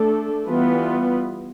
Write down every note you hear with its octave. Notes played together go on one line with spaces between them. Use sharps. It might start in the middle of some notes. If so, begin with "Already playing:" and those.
Already playing: A3 D4 A4
E3 G3 B3 F4 B4